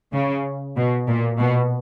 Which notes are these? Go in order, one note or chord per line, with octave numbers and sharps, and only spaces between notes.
C#3
B2
A#2
B2